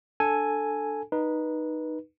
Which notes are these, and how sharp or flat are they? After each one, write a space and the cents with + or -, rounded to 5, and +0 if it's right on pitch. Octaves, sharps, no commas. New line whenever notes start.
D4 +0 A4 +0 G#5 +0
D#4 -10 B4 -20